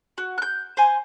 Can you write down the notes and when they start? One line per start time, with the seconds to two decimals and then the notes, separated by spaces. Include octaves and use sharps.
0.18 F#4
0.38 F#6 G6
0.77 C5 G#5